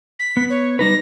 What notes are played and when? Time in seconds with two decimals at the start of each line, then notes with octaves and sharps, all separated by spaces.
0.19 B6
0.37 B3
0.50 C#5
0.79 G3 D#4 B4 A#6